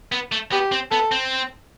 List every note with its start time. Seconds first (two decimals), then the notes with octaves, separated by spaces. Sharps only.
0.12 B3
0.32 A3
0.52 B3 G4
0.72 C4
0.91 B3 A4
1.12 C4